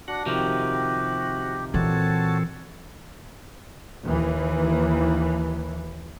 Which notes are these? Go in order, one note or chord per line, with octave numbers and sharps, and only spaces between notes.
D4 F#4 F#5
C3 D#3 F3 F#4 G4
A#2 E3 C4 F#4 A4 C#5 A5
D#2 E3